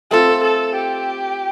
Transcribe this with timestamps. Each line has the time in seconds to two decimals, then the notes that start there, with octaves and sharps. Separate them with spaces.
0.11 A3 C4 F4 A4
0.43 A4
0.76 G4